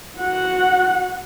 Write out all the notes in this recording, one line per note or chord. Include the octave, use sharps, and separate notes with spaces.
F#4 F#5